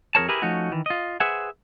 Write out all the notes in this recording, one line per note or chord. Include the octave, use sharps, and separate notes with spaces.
F2 G#4 A#4 C#5 A5
E4 G4 G#4 A#4 B4
F3 A3 C#4 D#4 F#4
D#3 E3
F4 D#5
G#4 B4 C5 E5 F#5 G#5